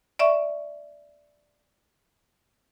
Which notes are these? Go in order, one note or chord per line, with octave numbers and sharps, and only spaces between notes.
D5 E5 C#6